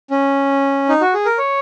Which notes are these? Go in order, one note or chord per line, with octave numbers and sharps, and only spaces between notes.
C#4
D#4
F#4
G#4
A#4
C#5